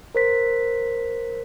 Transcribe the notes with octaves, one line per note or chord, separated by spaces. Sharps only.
A#4 C5 B6